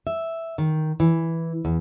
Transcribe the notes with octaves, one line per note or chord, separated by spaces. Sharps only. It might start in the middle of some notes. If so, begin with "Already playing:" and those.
E5
D#3
E3
E2